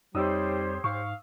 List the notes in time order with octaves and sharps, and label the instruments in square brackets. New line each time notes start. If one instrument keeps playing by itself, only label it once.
[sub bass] F2 [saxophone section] G3 [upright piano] D#4 D#6 E6 [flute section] G4 C5 C#5
[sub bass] G#2 [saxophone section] F5 [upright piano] C#6